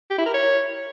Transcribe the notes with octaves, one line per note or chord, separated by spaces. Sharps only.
G4
E4
A#4
C#5